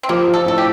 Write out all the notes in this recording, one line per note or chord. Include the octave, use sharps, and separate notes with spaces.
C4
F3 A#3
F3
A4
A2 A4
G4